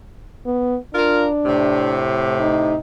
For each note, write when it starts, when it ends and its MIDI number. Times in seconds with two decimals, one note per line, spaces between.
0.46 0.77 59
0.95 2.01 62
0.95 1.26 65
0.95 1.26 70
1.45 2.76 45
1.45 2.76 48
2.40 2.77 63